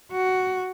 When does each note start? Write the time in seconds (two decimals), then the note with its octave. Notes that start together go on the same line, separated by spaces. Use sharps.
0.11 F#4